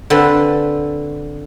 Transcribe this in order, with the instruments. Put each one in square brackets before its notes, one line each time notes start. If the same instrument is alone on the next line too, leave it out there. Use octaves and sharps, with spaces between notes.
[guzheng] D3 C4 A4 B4